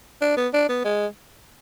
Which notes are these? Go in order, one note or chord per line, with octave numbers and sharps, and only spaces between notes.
D4
B3
D4
B3
G#3